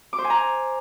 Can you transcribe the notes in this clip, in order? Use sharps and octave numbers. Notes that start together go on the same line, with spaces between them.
D6
C5
G#5
A#5